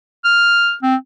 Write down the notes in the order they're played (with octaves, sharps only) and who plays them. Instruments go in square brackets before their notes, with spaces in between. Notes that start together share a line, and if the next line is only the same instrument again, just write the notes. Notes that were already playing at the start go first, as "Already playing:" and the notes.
[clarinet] F6
C4